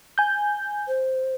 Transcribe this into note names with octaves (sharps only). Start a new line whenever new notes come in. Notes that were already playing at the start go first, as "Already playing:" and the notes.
G#5 G6
C5